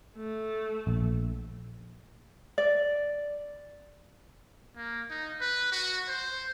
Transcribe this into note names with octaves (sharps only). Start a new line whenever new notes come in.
A3
A#1
D5
A#3
D#4
B4
F#4
C5